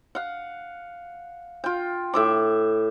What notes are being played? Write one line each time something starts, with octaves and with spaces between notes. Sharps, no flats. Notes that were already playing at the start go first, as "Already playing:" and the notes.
F5 F#5
F4 G5
A2 E5 D6